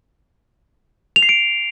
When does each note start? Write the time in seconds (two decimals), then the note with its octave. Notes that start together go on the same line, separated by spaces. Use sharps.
1.16 F7
1.23 C7
1.29 D7